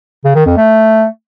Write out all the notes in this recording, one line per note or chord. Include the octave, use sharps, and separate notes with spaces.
C#3
D#3
F2
A3